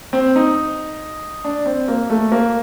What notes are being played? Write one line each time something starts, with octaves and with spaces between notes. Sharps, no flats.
C4
D#4
D4
C4
A#3
A3
A#3